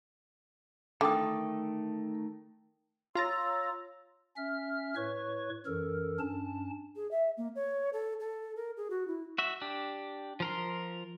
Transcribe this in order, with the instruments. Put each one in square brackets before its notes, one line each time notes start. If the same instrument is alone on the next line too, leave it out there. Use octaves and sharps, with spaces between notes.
[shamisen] D3 [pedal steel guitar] D#3 A3 A4 [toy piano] A#4 G5 D#6
[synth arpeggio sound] F4 A#5 A6 [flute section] C#5 C6 E6
[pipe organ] C#4 E5 F6
A2 B4 C#5 C#6
F#2 E3 A4 A#4
G2 C#4 D4 A5
[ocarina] G#4
E5
A#3
C#5
A4
A4
A#4
G#4
F#4
E4
[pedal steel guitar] F#4 E5
D4 G4
F3 A#4 C6